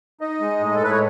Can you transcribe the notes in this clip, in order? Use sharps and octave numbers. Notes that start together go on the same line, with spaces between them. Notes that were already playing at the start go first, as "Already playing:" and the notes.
D#4 D#5
G#3
A2
A4
A2 B4
C#5